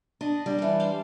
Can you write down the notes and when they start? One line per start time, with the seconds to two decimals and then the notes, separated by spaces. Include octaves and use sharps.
0.21 D4 D#5
0.46 G3
0.58 E3 D4
0.80 C5 D5 F5